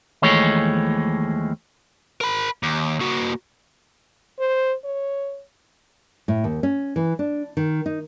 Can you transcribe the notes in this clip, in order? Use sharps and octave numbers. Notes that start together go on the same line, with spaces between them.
D#2 E3 F3 G#3 A3 C#5
A#4 B5
D#2
A#3 F#4
C5
C#5
A2
D#2
C#4
E3
D4
D#3
D#4